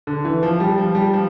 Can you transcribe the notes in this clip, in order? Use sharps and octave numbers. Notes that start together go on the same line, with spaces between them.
D3
E3
F3
G3
F3
G3
F3